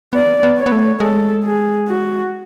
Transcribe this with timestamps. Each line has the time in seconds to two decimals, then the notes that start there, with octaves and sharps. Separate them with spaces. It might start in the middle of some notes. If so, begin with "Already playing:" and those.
0.13 B3 D5
0.43 B3
0.57 C#5
0.66 B3
0.72 A3
1.00 G#3 A4
1.44 G#4
1.88 F#4